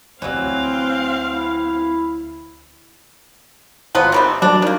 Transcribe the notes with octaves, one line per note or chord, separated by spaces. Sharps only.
D2 E3 F#3 C4 F5
E4
G#1 F3 F#3 B3
D#3 G3 C4
F#3 G3 D4 D5
D#3 A#3